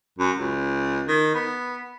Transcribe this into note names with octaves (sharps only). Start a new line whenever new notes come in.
F#2
C#2
D#3
B3